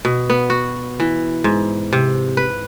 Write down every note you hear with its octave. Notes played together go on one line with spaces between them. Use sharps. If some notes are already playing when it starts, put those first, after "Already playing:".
B2
B3
F#4
E3
G#2
C3
B4